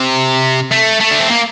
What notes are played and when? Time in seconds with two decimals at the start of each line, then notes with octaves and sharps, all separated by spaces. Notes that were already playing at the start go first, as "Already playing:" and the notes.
Already playing: C3
0.72 A3
1.01 A3
1.11 D4
1.20 C4
1.30 A#3